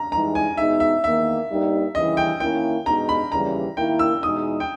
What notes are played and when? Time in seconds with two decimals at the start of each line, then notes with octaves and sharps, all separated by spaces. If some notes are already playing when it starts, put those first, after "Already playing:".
Already playing: A#5
0.12 G2 E3 G#3 D#4 A#5
0.35 G#5
0.57 B2 G#3 D#4 E5
0.80 E5
1.04 E2 D#3 A#3 E5
1.50 G2 G3 A#3 D#4
1.95 D#2 C#3 E3 G3 D#5
2.17 G5
2.40 D#3 A#3 C#4 E4 G5
2.86 B2 G#3 D#4 A#5
3.09 B5
3.32 D#2 C#3 E3 G3 A#5
3.77 D#3 A#3 E4 G5
3.99 E6
4.23 E2 B2 G#3 D#4 D#6
4.60 G5